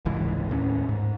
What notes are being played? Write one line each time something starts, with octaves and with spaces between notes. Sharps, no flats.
F1 C#2 G#2 E3
D#2 A2 C#4
G#2